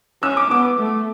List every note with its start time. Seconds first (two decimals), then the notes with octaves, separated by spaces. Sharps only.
0.22 C#4 E6
0.37 D6
0.50 B3 D6
0.79 A3